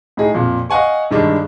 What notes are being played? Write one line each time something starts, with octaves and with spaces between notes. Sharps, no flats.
A2 D#4 G#4
F2 A#2
D#5 F5 F#5 G#5 C#6
G2 D3 D#3 G#3 D4